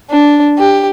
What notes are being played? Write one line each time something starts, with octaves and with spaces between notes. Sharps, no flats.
D4
G4